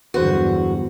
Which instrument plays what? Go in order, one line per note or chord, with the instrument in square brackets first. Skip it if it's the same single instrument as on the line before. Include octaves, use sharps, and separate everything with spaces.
[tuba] E2 [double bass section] G2 D3 F#3 [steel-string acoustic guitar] F#4 [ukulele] B4 C5